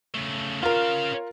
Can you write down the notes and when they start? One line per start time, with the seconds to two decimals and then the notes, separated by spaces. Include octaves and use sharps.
0.15 C#3 A3
0.63 C#4 F4 A#4 F5